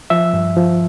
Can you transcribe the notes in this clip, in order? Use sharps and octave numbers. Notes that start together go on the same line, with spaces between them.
F3 E5
G2
F3